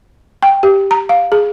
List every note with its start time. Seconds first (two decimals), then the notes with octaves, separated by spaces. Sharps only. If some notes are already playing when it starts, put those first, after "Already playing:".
0.43 G5
0.63 G4
0.91 A#5
1.09 F5
1.32 G#4